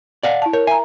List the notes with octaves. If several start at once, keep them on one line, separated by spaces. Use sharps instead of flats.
D5 F5 F#5
E4 A5
A#4 C#5
E5 G#5 A#5